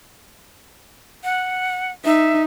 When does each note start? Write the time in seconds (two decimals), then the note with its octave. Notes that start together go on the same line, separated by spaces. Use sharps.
1.24 F#5
2.05 D#4 E5